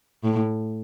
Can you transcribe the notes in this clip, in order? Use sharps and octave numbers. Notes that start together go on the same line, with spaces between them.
A2